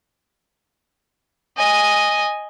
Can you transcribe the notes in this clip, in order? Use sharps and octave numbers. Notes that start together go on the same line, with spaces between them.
D#5 G#5